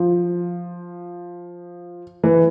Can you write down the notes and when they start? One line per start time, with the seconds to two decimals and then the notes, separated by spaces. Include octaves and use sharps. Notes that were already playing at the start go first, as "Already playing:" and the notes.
Already playing: F3
2.24 E3